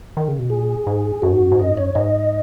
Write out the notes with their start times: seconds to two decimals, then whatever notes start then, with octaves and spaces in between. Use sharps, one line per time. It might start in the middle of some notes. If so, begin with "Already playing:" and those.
0.17 D#3
0.28 C#3
0.39 B2
0.50 A#2 G#4
0.87 G#2
1.22 F#2 F#4
1.33 G#2
1.42 F#2
1.52 G#2
1.59 F#2 D#5
1.70 G#2
1.77 F#2 C#5
1.95 G#2 D#5